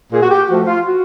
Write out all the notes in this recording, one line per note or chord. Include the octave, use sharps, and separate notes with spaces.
A#2 G#4
F#4
G4
F3 A3 F#4
F4
F#4